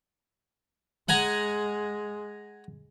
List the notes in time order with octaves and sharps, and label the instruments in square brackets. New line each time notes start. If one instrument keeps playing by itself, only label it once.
[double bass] G#3 [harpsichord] F#5 G#5 A#5